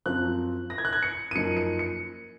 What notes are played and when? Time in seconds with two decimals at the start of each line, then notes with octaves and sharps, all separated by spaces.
0.06 F#2 F3 C4 F4 F#6
0.70 A#6
0.78 G#6
0.85 F#6
0.93 G#6
1.03 C#7
1.31 D#7
1.35 F#2 F3 A#3 D#4 C#7
1.57 C#7
1.79 C#7